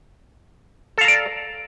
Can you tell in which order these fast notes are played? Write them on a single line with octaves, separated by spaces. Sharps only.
A4 F5 A#5 D5